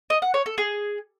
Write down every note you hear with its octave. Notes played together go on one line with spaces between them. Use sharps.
D#5
F#5
C#5
A4
G#4